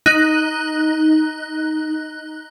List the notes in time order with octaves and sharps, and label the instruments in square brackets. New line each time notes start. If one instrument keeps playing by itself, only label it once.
[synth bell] D#4 F#6